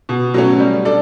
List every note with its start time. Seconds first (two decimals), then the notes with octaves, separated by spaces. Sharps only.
0.09 B2
0.34 F#3 A3 C#4
0.60 G3
0.85 D4 A4 D5